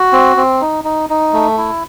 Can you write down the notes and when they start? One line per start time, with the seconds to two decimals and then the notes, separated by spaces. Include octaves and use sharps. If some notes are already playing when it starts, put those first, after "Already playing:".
Already playing: F#4
0.13 C4
0.36 C4
0.61 D#4
0.84 D#4
1.10 D#4
1.33 A3
1.57 E4